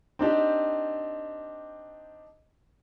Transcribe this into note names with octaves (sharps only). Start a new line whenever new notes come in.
C4 D4 D#4 G4